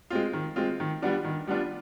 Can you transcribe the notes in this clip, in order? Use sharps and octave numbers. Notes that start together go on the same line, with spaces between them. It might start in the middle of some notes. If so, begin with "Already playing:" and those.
G#3 C4 F4
D#3
G#3 C4 F4
D#3
G3 B3 D4 F4
D#3
G3 B3 D4 F4